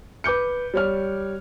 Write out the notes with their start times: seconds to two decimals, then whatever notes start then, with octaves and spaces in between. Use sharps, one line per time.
0.24 B4 D6 G6 C#7
0.74 G3 C#5 F6